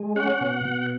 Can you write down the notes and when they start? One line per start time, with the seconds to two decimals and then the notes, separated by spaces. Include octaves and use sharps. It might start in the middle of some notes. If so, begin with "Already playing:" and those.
Already playing: G#3
0.16 C#4 F#5
0.41 B2
0.65 B2